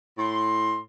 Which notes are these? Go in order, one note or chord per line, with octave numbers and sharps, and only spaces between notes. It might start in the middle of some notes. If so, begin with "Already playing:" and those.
A2 C6